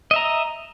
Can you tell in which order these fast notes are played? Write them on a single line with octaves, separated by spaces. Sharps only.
D#5 E5 A#5